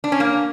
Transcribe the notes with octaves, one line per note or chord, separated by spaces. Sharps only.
D4
C#4
A#3